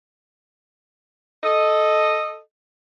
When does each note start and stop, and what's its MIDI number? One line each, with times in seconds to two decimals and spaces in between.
1.43 2.39 69
1.43 2.39 75